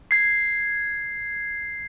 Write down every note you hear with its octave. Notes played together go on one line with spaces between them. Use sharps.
G#6 C7